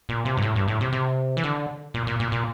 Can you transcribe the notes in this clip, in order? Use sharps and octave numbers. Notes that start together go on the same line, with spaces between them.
A#2
C3
G2
A2
G2
A2
C3
C3
E3
D3
A#2
A#2
A#2
A#2